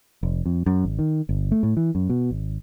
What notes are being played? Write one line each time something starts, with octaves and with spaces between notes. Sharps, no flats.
F1
F2
F#2
G#1
D#3
G1
A3
A2
E3
F#2
B2
G#1